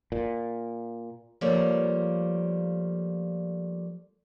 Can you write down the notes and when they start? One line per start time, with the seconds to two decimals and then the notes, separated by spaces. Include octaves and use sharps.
0.12 A#2
1.41 F3 G3 A3 A#3 C#5 D5